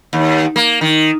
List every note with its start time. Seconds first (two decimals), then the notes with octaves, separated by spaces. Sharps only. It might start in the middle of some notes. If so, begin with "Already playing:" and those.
0.13 D#2
0.56 A#3
0.81 D#3